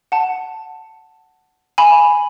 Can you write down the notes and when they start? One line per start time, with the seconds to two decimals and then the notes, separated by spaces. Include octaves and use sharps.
0.12 F#5 A5
1.78 G#5 B5